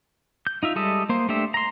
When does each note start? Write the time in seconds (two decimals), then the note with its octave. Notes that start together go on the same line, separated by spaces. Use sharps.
0.47 G6
0.63 D#4 F4 E5
0.76 G3 G#3 A4 D#5 E5
1.09 A#3 C5
1.29 A3 D4 G4 C5 E5
1.54 A#5 C6